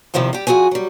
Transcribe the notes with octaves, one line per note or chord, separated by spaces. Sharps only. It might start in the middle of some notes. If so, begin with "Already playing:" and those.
E2 C3 D#3 F3 E4 G4
G3 G4
F2 B2 F#4 G#4 G#5
F#3 G3